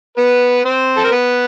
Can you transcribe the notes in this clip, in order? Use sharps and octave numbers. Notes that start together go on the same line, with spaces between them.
B3 B4
C4 C5
A4
A#4
B3 B4